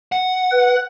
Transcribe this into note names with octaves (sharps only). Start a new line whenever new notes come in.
F#5
B4